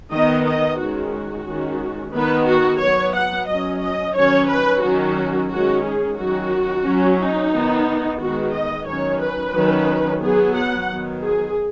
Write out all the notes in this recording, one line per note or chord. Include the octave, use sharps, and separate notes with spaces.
D#3 B3 D#5
D#5
D#3 G#3 C#4 F#4
F#4
D#3 G#3 C#4
D#3 B3 B4
F#4
F#3 B3 C#5
F#5
F#3 C#4 D#5
D#5
D#3 F#3 C#4 C#5
B4
D#3 F#3 C#4 F#4
D#3 G#3 C#4 F#4
G#4
D#3 F#3 C#4 F#4
F#3 C#4
D#4
D#3 B3
D#3 G#3 B3 F#4
D#5
D#3 F#3 C#4 C#5
B4
D#3 F#3 C#4
F#3 B3 G#4
F#5
D#3 F#3 B3
G#4